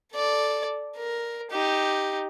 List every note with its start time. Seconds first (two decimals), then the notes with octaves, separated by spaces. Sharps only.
0.13 A4 D5
0.97 A#4
1.50 D#4 G4